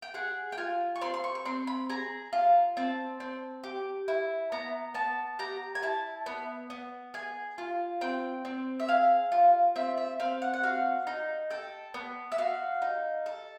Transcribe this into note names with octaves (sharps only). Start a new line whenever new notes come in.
G5
G#4 F#5
G5
F4 G#5
C#6
C4 C6
C6
C#6
C#6
C4 C6
B5
G#4 A#5
F4
C4 A5
C4
G4
E4
B3 A#5
B3 A5
G4 A#5
G#5
E4 A5
B3
B3
G#4 G#5
F4
C4 G5
C4
E5
G#4 F5
F4
C4 E5
E5
C4 F5
F#5
F#5
F#4 F5
D#4
A4 G5
B3
E5
F#4 F5
D#4
A4